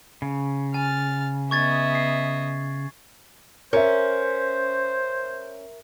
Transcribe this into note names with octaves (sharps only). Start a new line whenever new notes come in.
C#3
G#5 F6 A6
B3 D#5 E5 C#6 G#6 A6
C7
C#4 A#4 C5 E5